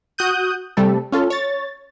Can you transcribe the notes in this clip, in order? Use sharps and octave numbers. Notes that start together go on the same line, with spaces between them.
F#4 D#6 F#6 G6 D#7
C3 G3 A3 A4
C#4 F4 A4
C#5 A6